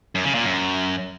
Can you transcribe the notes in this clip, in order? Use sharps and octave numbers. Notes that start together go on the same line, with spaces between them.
F#2
C#3
A#2
F#2